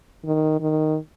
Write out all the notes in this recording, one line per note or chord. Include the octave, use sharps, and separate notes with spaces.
D#3
D#3